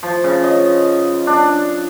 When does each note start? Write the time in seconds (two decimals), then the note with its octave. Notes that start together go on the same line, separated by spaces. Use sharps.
0.03 F3
0.24 C#3
0.44 D#5
1.27 D4